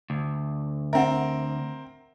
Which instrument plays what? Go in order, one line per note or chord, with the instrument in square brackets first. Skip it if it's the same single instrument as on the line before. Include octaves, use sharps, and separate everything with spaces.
[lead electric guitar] D2
[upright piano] C4 A#4 [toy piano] E5 F#5